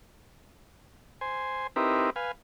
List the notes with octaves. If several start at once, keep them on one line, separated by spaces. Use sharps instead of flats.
C5 G#5
C4 D#4 E4 G4 A#4 B4
B4 F5 G#5